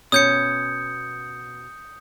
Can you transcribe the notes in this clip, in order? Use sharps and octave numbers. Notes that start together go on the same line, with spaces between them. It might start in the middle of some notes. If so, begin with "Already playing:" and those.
B2 C#4 D#6 G6 C#7